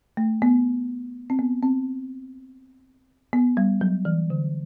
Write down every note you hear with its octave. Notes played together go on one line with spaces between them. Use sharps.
A3
B3
C4
B3
C4
B3
G3
F#3
E3
D3